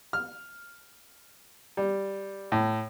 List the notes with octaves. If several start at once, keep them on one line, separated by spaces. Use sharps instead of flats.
F6
G3
A2